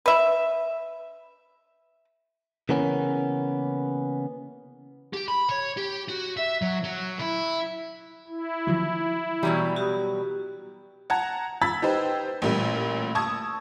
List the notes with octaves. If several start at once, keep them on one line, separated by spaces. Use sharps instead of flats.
B4 E5
C#3 E3 A#3 B3 C#4
G4
B5
C#5
G4
F#4
E5
F#3
F#3
E4
E4
D#3 F3 F#3
B2 E3 F#3 G3 A#5 C#6
F#4 G4 D#6
F#5 A5 A#5 G#6
B5 E6 G#6 A6 B6
D#4 G4 B4 C5
A1 A#2 G3
A5 C#6 D#6 E6 G#6